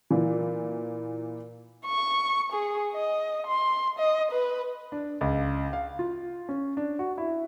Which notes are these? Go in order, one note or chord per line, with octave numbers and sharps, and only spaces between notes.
A#2 E3
C#6
G#4
D#5
C6
D#5
B4
D4
C#2
F5
F4
C#4
D4
F#4
E4